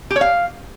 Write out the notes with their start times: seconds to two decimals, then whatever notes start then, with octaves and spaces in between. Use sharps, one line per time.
0.11 G4
0.16 C#5
0.21 F5